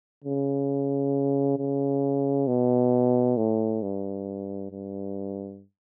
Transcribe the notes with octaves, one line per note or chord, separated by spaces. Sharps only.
C#3
C#3
B2
A2
G2
G2